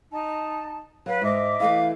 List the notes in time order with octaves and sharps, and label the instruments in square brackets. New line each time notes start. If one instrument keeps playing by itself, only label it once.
[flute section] D#4 A5
[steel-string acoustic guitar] F#3 [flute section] B4 F5
[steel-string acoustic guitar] G#2 [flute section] D#5 E5 D6
[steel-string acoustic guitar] E3 A3 E4 [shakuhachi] F5